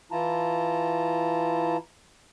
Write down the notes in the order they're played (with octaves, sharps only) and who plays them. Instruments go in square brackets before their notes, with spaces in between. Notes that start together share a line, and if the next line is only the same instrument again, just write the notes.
[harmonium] E3 E4 F4 A5 A#5